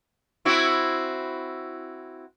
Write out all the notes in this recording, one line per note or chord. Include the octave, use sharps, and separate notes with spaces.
C4 E4 F#4